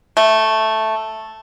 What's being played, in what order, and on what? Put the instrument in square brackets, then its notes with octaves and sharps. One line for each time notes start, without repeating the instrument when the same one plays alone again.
[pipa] A3